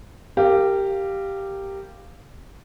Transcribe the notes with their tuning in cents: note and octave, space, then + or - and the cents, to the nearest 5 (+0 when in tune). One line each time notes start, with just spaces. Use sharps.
G4 +0 A#4 -25 F5 +0